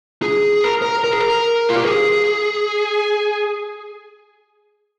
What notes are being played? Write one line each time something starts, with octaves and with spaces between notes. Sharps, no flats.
G#4
A#4
A#4
A#4
G#4
A#4
F4
G4
G#4